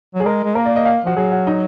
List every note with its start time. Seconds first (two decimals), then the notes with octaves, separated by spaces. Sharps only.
0.15 F#3
0.20 G#4
0.25 G#3 A#4
0.44 G#3
0.55 A#3 A#4
0.66 D5
0.76 D#5
0.85 F5
1.05 F3 F#4
1.16 F#3 G#4
1.32 F#4
1.47 D#4